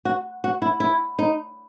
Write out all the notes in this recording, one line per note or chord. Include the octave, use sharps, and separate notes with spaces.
F#4
F#4
E4
E4
D#4